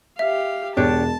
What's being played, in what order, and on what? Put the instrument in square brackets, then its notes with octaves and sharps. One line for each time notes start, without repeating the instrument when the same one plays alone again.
[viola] G4 F5 [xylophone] E5
[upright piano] E1 [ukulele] D4 G4 C#5 [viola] A5